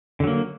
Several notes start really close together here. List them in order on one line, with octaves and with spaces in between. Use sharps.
D3 F#3 A#3